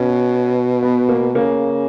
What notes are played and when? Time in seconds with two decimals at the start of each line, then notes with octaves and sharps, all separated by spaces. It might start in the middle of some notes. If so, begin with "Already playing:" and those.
Already playing: B2 C#4
0.83 B3
1.09 A#3
1.35 C#3 A#3